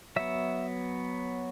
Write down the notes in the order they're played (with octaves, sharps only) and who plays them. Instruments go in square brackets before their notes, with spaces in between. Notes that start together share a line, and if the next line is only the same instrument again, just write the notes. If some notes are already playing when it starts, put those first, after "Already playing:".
[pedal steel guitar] F#3 B3 E5